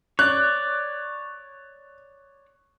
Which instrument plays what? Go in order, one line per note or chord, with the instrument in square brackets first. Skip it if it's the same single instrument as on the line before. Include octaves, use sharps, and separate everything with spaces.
[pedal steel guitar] C#5 D5 [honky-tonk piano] F#6